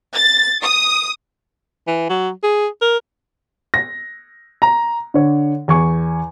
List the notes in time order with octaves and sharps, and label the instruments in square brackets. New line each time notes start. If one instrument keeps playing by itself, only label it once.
[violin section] A6
D#6
[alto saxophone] E3
F#3
G#4
A#4
[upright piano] A#6
A#5
D3 C#5
E2 G#5 C#6